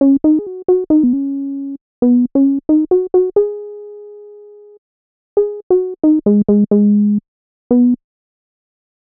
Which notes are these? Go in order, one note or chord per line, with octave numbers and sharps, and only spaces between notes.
C#4
D#4
G#4
F#4
F#4
D#4
B3
C#4
B3
C#4
D#4
F#4
F#4
G#4
G#4
F#4
D#4
G#3
G#3
G#3
B3